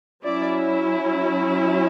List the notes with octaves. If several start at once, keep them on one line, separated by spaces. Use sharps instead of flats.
F#3 C#4 E4 D5